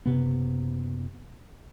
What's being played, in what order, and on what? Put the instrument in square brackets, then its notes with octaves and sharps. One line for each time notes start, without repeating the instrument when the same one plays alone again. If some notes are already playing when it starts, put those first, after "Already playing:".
[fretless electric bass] F#1 C3 B3